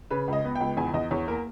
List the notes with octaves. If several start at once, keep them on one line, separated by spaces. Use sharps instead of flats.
C#3 B4
C#2 D#5
B3
C#2 G5
E2 G#5
E2 D#5
E2 C#5
A#3 A#4